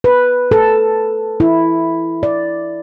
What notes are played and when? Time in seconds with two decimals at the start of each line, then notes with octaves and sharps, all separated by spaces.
0.04 B4
0.51 A4
1.40 E4
2.23 D5